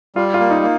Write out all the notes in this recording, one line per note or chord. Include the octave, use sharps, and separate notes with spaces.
G3 F4
F4
A#3
D#4
A#3